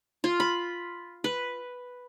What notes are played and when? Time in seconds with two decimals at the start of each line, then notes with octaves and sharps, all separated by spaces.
0.24 F4
0.40 B5
1.24 B4